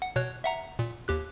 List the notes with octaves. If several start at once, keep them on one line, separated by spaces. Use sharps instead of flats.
F#5
B2 C#5 F#6
E5 F#5 A#5
A#2
D#2 G4 F#6